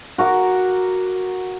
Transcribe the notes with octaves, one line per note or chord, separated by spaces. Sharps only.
F#4 A#4 D6